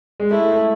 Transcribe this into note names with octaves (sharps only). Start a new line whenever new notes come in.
G#3
A3 E4
A3